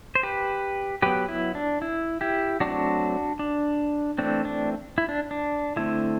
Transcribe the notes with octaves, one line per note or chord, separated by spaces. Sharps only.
C5
G4 B4
F#3 B3 G4 B4
E4
D4
E4
E4 G4
F#3 A3 C4 D4 F#4
D4
E3 A3 C4 D4
D4
E4
D4
D4
D3 A3 C4 E4